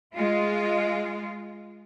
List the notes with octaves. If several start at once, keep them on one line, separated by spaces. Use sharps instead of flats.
G#3 F4